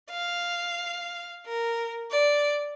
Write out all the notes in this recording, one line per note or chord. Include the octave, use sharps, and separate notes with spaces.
F5
A#4
D5